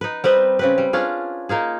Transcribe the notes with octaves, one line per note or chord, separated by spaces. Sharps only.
D#4 B4
G3 C4 B4 D#5
C#3 C4 B4
G3
C#4 D4 F4 G#4
A#3 D#4 F4 G#4